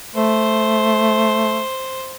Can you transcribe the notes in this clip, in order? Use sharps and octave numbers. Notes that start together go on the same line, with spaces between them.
A3 C5